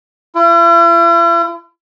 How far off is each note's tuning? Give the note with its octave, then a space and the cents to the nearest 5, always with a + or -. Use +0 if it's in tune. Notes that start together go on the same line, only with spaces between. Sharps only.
E4 +45